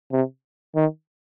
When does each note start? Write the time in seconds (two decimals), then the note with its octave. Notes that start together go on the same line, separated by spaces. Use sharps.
0.12 C3
0.76 D#3